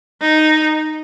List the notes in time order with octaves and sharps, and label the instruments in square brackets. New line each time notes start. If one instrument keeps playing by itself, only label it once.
[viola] D#4